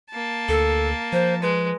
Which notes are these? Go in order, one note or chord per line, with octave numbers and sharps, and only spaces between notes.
A#3 A5
D2 A4
F3 C5
G#3 B4